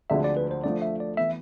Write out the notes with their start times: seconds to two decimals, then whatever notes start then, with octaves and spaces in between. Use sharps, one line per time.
0.10 D2 D3 F3 G#3 E5
0.24 D5
0.37 B4
0.51 C5
0.64 F3 A3 D4 D5
0.82 E5
1.00 D5
1.17 E3 B3 E5